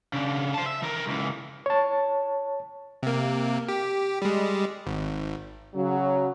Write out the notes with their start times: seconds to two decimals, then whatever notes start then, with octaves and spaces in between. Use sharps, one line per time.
0.13 C#3 D4
0.54 C5 A5
0.66 E5
0.82 E3 A#4
1.08 C#2 E3
1.66 C#5 A5
3.03 C3 A#3
3.68 G4
4.22 G3 G#3
4.87 G#1
5.75 C#3 F#3